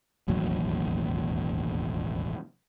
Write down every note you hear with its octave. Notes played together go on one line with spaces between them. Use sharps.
E1 A1 D#2 F#3